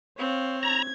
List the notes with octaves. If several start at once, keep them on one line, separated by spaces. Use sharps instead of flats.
C4 C#5 F5
A#5 G#6